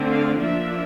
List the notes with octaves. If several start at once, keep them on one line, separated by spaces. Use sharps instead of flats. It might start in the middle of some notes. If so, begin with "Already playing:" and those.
Already playing: D3 A3 C4
F5
F3 A#3 D4 E5